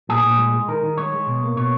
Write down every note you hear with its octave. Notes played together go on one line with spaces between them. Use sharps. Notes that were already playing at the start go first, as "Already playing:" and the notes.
A#2 G#4
A#2
G#3
G#3
D#3 A#4
D#3
G#3 C#5
G#3
B2
A#3
B2 C#5